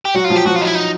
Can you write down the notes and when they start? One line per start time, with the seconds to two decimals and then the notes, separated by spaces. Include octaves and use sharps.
0.05 G4
0.15 F#3 F#4
0.24 F4
0.30 F3
0.36 G4
0.46 F3 F#4
0.55 F4
0.61 D#4
0.66 E4
0.75 D#4